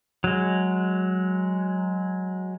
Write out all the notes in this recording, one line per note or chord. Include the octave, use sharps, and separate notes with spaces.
F#3 G#3